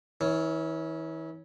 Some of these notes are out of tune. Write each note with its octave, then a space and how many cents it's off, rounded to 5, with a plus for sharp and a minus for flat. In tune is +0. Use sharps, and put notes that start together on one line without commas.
E3 -35 C#4 +0